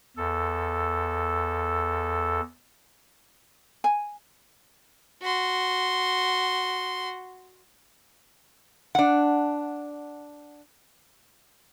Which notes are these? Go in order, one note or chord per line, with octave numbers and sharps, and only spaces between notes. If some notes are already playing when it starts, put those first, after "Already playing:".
E2 A4
G#5
F#4 C6
D4 F#5